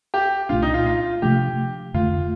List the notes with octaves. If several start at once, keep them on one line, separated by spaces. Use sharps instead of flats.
G4
C2 A#2 A3 D4 F4
D#4
F4
F4
C3 F3 A3 D4 G4
F2 D3 A3 F4